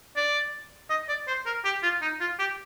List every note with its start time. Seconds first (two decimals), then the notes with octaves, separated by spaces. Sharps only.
0.16 D5
0.90 D#5
1.09 D5
1.28 C5
1.46 A#4
1.65 G4
1.83 F4
2.02 D#4
2.21 F4
2.39 G4